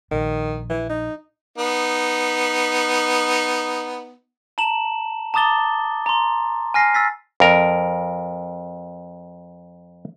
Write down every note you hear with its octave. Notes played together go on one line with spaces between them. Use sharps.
A#1 D#3
E3
D#4
B3 D#4
A5 A#5 E7 F#7
A5 A#5 D6 D#6 A6 G7
A#5 C6
G#5 F6 A#6 C7
E6 A6 B6
F2 A#4